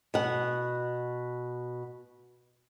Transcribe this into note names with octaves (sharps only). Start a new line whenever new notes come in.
B2 F#5